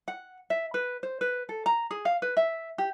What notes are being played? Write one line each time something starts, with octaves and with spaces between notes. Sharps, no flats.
F#5
E5
B4
C5
B4
A4
A#5
G#4
F5
B4
E5
G4